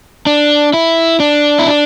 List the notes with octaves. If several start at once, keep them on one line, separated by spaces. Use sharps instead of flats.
D4
E4
D4
E4
D4